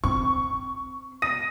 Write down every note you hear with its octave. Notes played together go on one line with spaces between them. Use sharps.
C4 C#6
D#6 A#6 D#7